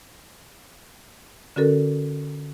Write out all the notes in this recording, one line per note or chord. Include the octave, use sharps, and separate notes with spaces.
D3 C#4 F#4 A4 A#4